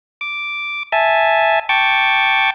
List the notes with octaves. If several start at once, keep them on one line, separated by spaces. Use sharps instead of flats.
D6
E5 G#5 A5
G5 A5 C#6 D6